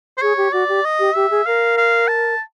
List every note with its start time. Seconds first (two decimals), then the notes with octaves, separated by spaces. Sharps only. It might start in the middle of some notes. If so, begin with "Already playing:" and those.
0.18 C5
0.22 G#4 C#5
0.37 G4
0.52 F#4 D5
0.69 G4
0.85 D#5
0.99 G4
1.15 G4 E5
1.31 G#4
1.46 A#4 F5
1.78 F5
2.08 A5